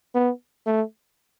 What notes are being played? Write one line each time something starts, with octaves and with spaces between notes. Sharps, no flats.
B3
A3